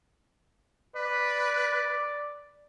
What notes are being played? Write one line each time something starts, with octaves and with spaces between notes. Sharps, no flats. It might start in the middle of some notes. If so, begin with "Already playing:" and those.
B4 D5